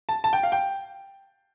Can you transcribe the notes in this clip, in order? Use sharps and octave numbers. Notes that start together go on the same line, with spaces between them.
A5
A5
G5
F5
G5